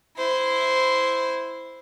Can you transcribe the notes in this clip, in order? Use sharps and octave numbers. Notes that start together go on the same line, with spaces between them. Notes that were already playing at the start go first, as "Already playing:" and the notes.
E4 C5